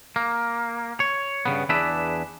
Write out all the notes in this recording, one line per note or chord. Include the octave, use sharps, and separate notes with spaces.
A#3
C#5
G2 C#3 B3
E2 D4 G#4 B4 D5 E5